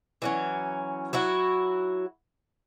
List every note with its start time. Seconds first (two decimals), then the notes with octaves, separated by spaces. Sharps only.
0.22 E3 F#3 C#4
1.13 F#3 E4 F#4